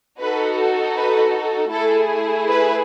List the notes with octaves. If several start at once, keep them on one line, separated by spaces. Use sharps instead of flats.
D#4 F#4 A4 B4
B4
A3 E4 G#4 A4
B4